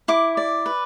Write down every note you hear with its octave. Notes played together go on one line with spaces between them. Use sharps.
E4 D6
D5
B4